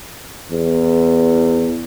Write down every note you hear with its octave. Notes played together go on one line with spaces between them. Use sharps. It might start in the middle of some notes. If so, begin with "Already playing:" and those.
E2